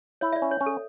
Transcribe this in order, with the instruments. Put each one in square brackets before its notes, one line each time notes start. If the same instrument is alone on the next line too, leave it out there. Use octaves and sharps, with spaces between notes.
[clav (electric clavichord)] E4 [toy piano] C#5
[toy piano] E5
D5
[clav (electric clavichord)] C#4
[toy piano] C#5
[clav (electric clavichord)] C#4
[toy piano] A4